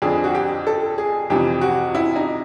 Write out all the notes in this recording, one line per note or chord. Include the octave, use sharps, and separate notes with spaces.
F2 D3 G#4
F#4
G4
A4
G#4
F2 C3 E3 G4
F#4
E4
D#4